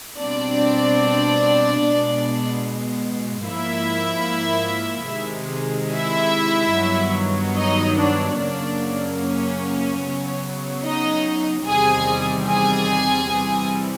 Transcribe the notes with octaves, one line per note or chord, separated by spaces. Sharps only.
B2 G3 C4 D4 D5
B2 G#3 B3
G#2 F3 A#3 E4 E5
C3 D#3 G#3
E4 E5
G2 D#3 F#3 B3
D#4 D#5
D4 D5
F#2 C#3 F#3 A#3 D4 D5
C#4 C#5
C#3 F#3 B3
D#4 D#5
E2 C3 D#3 G3 C4 G#4 G#5
G#4 G#5
C3 E3 G3 C4